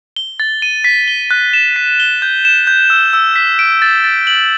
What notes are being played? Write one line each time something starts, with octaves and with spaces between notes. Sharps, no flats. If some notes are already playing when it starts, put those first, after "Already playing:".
G7
A6
D#7
B6
G7
F#6
E7
B6
G7
G6
E7
G6
E6
E6
B6
D7
A6
A6
F#7